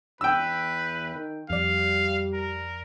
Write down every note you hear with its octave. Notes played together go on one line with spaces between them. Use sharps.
E2 B4 G5 E6
D#3
F2 G3 D5 F5
A#4